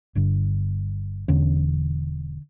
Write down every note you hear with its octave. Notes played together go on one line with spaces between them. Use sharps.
G1 G2 D3 D4
E1 E2 D3 C#4